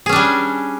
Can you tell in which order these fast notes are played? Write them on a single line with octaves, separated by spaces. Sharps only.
G#4 C#4 D4 G3